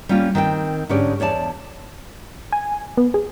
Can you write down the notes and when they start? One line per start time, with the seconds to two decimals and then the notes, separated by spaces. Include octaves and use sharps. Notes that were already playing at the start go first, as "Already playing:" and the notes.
0.09 G3 A#3 C#4 F4
0.35 D#3 C4 E5 G5
0.89 G#2 D3 G#3 C#4 G4 D5
1.20 E2 C#5 D5 A5
2.52 G#5
2.97 B3
3.14 G#4